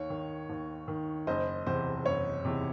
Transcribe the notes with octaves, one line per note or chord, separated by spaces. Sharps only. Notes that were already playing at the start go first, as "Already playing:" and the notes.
Already playing: D#2 C#5
D#3
D#2
D#3
F#1 C5 D#5
E2 C3 C5
F#1 C#5
E2 C3